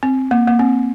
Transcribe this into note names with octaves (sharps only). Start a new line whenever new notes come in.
C4
A#3
A#3
C4